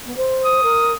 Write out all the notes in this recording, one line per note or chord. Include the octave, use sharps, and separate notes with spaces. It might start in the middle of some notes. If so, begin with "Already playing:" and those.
B3
C5
D#6
A#4